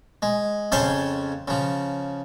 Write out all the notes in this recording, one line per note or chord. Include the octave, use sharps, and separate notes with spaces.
G#3
F2 C#3 C#4 C5 F5 A5
C#3 F3